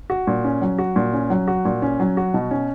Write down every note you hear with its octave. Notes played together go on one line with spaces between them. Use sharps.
F#4
A#2
C#4
F#3
F#4
A#2
C#4
F#3
F#4
A#2
C#4
F#3
F#4
B2
C#4